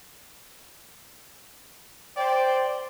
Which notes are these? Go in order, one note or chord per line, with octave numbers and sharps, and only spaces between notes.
C5 D5 G5